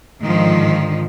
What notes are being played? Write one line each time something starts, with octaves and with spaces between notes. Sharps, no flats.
G#2 D3 D#3 F3